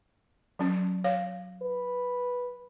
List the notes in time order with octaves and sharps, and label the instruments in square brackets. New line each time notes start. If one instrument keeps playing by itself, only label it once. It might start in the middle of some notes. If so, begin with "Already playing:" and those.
[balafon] F#3 C#4
C#5 F5
[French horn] B4